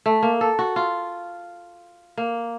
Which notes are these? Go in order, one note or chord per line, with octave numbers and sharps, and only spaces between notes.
A3
A#3
A4
F#4
F4
A#3